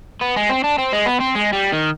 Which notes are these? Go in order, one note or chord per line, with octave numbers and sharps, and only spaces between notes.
B3
G#3
C4
D4
C4
G#3
B3
C4
G#3
G3
D#3